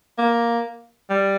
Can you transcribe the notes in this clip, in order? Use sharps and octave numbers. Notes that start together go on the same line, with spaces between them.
A#3
G3